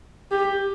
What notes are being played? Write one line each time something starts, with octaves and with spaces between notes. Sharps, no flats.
G4